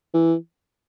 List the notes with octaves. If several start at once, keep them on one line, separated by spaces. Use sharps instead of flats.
E3